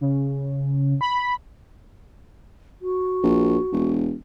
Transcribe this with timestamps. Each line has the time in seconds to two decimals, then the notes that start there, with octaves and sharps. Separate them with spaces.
0.01 C#3
1.01 B5
2.81 F#4
3.23 A#1
3.72 E1